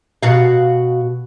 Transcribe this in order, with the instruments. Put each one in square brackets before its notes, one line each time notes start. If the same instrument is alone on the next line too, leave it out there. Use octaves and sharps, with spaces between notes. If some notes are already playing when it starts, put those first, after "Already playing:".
[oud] B2 F#4 F5